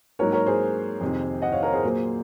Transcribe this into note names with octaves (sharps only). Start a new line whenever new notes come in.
G#2 F#3 A#3 A#4 C#5
A#4 C#5
G#4 C5
F2 C3 D#3
D#5 F#5
C#5 F5
A#4 C#5
G#4 C5
A#2 F#3 A#3